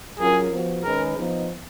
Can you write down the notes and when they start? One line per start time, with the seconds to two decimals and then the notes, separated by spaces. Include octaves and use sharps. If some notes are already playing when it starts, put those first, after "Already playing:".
0.19 F#3 C#4 F4 G#4 A#4
0.51 F3 B3 F#4
0.84 D#3 G#3 C#4 G#4 A#4 B4
1.17 F3 B3 D#4